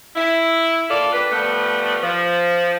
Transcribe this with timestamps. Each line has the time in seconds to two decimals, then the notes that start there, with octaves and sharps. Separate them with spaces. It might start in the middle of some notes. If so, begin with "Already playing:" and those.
0.15 E4
0.90 A#3 F4 A4 D5
1.11 G3 D4 B4
1.31 F3 G3 A3 B3
2.03 F3